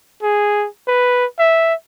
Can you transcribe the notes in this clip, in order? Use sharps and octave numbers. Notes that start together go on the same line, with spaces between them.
G#4
B4
E5